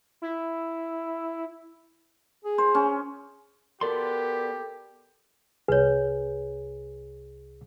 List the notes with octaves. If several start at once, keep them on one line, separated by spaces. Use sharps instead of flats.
E4
G#4
C5
C#4
B3 F#4 G4 A4 A#4 D5 C6
C2 G#4 B4 C#5